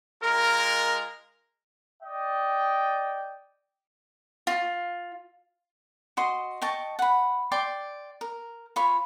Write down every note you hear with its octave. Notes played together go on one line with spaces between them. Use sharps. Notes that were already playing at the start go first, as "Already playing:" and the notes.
G#3 F4 A#4
D5 D#5 G5
F4
F#4 D#5 C6
D#5 G5 A5 C#6
F#5 B5
D5 G5 C6
A#4
F4 C#5 B5